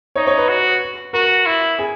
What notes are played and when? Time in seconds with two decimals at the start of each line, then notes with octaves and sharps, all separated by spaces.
0.16 D#4 C#5
0.27 C#5
0.38 B4
0.49 F#4
1.13 F#4 A#4
1.46 E4
1.79 G#4